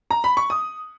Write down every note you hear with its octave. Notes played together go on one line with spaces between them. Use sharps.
A#5
B5
C#6
D#6